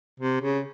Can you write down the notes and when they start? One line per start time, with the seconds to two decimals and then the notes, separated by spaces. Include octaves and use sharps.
0.20 C3
0.41 C#3